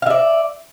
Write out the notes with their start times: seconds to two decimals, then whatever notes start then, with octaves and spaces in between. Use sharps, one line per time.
0.02 F5
0.06 E5
0.10 D5